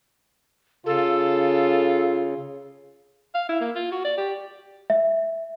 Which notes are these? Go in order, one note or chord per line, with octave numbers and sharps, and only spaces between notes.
C#3 F4 A4
F5
E4
A#3
F4
F#4
D5
G4
E5